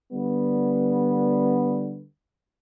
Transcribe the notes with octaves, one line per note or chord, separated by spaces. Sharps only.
D3 G3 B3